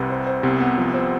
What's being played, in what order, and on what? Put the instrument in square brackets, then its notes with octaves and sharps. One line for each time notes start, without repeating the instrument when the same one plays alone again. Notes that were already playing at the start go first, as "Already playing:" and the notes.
Already playing: [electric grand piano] C2 C3 [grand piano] B4
[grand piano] C5
C5
[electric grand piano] C2 C3 [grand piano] B3
[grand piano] B3
F3
C4